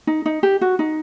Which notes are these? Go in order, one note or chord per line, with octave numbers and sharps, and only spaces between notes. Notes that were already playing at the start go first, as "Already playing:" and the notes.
D#4
D#4
G4
F#4
D#4